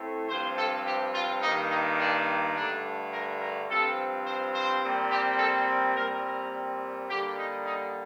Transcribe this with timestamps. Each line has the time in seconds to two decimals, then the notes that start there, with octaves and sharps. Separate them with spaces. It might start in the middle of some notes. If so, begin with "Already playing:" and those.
Already playing: A2 A3 C4
0.29 G2 F3 C4 C5
0.57 A4
0.86 G4
1.14 F4
1.42 G2 D#3 A#3 D#4
1.71 D#4
1.99 D4
2.56 G2 D3 A3 D4
3.12 A#4
3.41 A#4
3.69 G2 F3 C4 A4
4.26 C5
4.54 C5
4.82 A#2 G3 C4
5.11 G4
5.39 A4
5.95 A#2 G3 C4 A#4
6.24 A#4
7.09 D3 G3 A#3 G4
7.37 D#4
7.65 D#4